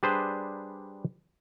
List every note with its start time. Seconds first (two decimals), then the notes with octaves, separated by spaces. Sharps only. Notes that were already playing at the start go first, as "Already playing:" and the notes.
0.03 G3 D4 G#4 B4 C5